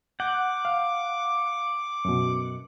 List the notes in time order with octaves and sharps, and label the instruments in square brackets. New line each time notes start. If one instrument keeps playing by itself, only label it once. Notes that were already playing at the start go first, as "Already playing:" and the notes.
[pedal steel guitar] F#5 [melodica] D6 [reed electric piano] G6
[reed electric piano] F5
F#2 B2